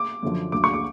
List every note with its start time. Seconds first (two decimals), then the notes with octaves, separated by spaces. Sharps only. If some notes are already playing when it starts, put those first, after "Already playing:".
Already playing: D6
0.23 F#2 D3 F3
0.52 D2 D3 F#3 D6
0.64 C#6
0.74 D6